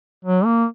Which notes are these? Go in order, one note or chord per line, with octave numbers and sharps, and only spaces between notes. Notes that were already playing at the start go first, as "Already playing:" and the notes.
F#3
A#3